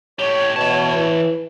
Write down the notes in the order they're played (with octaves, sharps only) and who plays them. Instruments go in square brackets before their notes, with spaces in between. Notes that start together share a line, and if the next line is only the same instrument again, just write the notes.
[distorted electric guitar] A2 G4 [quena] C#5
[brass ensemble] B2 [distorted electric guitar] E3 A5
[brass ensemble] E4 B4